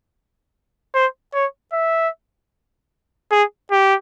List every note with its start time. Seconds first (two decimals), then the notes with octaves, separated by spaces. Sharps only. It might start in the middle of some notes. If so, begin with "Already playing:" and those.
0.94 C5
1.34 C#5
1.73 E5
3.31 G#4
3.71 G4